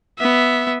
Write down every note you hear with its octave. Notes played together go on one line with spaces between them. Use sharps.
B3 E5